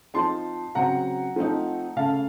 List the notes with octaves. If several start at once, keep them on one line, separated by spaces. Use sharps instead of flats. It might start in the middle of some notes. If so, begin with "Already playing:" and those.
F3 C4 D#4 A5 C6
C#3 F#3 C4 F#5 A#5
F3 A3 C4 D#4
C#3 A3 C#4 F5 A5